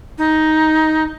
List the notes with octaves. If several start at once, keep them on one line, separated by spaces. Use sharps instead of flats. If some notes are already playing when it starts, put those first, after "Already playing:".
D#4